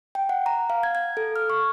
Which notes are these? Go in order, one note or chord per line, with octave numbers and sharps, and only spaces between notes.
G5
F#5
A#5
F5
G#6
G#6
A4
F6
C#6